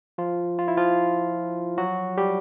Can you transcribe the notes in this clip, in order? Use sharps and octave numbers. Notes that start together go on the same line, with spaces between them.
F3 F4
F4
E4
F3 F4
F#3 F#4
G3 G4